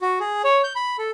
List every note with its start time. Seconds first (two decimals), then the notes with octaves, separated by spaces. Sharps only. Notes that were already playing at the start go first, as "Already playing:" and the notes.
0.01 F#4
0.20 G#4
0.44 C#5
0.64 G6
0.76 B5
0.98 A4